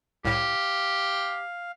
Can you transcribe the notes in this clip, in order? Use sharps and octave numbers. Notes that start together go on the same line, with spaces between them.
C2 A2 G4 F5